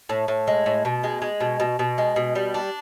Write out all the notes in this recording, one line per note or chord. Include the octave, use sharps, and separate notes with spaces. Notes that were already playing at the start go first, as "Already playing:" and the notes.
A2
A2
G#3
A2
B2
G#3
G#3
B2
B2
B2
G#3
B2
G3
D4